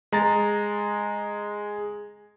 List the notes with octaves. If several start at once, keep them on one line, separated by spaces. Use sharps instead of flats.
G#3 A#5 A6